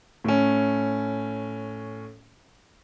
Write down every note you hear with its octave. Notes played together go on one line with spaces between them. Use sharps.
A2 C#4